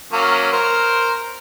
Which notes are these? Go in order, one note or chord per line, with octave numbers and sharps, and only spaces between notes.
F#3 A#3 C#4
A#4 C5